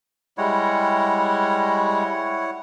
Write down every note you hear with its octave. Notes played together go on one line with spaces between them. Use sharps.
G3 G#3 E4 C#5 F#5